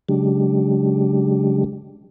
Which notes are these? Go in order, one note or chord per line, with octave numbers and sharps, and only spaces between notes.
C#3 F#3 G#3 D4 G4